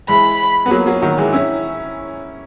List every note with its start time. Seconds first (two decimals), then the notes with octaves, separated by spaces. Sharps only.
0.08 E3 G#3 B5
0.66 B3
0.70 F#3 A#3
0.86 F#3 A#3
1.01 D#3 F#3
1.18 E3 G#3
1.33 C#4 E4